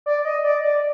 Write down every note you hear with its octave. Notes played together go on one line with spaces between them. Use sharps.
D5
D#5
D5
D5